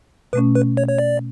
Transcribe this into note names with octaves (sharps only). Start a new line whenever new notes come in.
B2 A3 C#4 B4
B4
C#5
C#5
D5